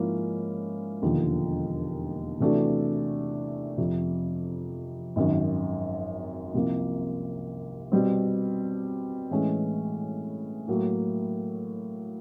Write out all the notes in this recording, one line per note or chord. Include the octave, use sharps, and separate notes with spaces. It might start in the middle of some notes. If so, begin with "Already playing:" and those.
Already playing: G#2 F3 A#3 C#4 E4
E1 D#2 D3 F3
C3 E3 A3 D4 F#4
F2 C3 F3
G#1 F#2 D#3
C2 C3 F3 A#3
B2 G3 C4
A2 E3 G#3 C#4
A2 F#3 A#3